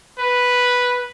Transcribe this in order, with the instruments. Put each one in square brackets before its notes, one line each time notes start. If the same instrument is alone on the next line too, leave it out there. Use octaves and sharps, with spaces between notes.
[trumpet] B4